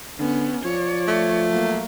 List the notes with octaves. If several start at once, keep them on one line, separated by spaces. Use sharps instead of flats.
D3 B3 C#4
F3 C#5 D5
A3
F#3 A#3